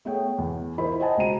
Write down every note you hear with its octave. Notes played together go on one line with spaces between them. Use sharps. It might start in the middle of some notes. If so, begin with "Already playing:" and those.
A3 B3 G#4 C#5 G5
E2
E4 F4 A#4 C5 B5
C5 D#5 F#5 G#5 A5
C#2 B2 A#5 D#7